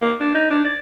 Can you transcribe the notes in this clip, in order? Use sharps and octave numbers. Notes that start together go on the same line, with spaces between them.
A#3
D4
D#4
D4
D5